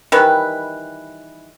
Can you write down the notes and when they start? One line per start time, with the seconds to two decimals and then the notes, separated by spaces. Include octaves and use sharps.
0.12 D#3 E3 G3 B4